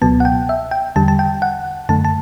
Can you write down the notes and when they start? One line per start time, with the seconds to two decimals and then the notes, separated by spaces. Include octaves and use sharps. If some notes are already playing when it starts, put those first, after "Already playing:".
0.02 C#2 B2 F#3 B3 A5
0.20 F#5
0.25 G5
0.49 E5
0.71 G5
0.96 E2 D3 G3 A5
1.08 A5
1.19 G5
1.42 F#5
1.89 F#2 D3 A3 A5
2.05 A5